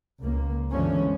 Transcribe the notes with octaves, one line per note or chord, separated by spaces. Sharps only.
C#2 A#3
G1 D3 E3 F3 G#3 C#4